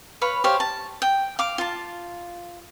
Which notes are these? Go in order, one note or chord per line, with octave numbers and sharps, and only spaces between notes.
B4 C#5 F5 B5
G4 C5 C#5 F5
A5
G5
F5 D6
F4 A5